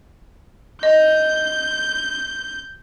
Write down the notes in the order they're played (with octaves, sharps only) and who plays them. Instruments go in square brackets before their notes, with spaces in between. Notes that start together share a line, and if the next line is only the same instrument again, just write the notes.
[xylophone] D#5 [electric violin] G6